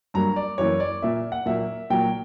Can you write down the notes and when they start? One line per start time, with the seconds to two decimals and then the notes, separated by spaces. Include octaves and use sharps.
0.14 G2 F#3 A#3 A#5
0.36 D5
0.58 F#2 E3 A#3 C#5
0.80 D5
1.02 A#2 A#3 E5
1.32 F#5
1.46 A#2 F#3 A#3 E5
1.90 A#2 F#3 A#3 G5